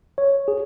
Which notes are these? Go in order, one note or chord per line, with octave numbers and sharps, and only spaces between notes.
C#5
G#4